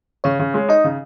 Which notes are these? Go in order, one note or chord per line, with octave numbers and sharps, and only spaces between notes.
C#3 C#5
C#3
G#3
D#4 D#5
C#3